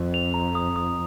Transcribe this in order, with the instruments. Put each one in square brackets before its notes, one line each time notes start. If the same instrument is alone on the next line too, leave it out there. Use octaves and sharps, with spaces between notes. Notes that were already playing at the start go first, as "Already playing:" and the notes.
Already playing: [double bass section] F2
[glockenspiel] F7
A#5
D#6
D#6